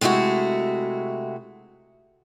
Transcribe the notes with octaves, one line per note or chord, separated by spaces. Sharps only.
C3 G#3 A3 E4 F#4